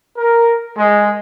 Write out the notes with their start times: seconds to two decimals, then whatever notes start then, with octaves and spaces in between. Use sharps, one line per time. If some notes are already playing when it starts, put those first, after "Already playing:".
0.18 A#4
0.78 G#3